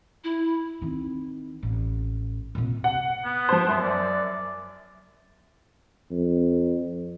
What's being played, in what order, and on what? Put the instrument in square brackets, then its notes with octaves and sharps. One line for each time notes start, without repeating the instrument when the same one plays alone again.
[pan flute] E4
[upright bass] D#3 C4
A1
C2 A#2
[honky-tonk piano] F#5
[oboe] B3
[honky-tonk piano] F3 C5
F#2
[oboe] D5
[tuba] F2